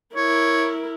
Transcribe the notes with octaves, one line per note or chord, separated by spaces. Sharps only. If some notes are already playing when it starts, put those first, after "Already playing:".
E4 A#4 C#5